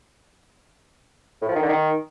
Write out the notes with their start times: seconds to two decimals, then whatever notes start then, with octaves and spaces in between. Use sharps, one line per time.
1.42 A2
1.48 F3
1.55 D#3
1.62 D3
1.69 D#3